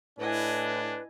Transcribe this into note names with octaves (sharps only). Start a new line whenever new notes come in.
A2 D4 E4 B4 D#5 G#5